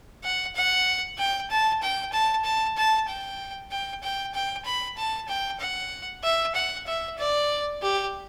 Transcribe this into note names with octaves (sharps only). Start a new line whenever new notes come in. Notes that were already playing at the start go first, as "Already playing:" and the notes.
F#5
F#5
G5
A5
G5
A5
A5
A5
G5
G5
G5
G5
B5
A5
G5
F#5
E5
F#5
E5
D5
G4